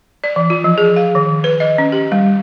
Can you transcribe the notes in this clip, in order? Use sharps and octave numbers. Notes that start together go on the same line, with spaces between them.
D5
E3
F4
F3
G#4
F5
D#3
B4
D#5
C#4
G4
G3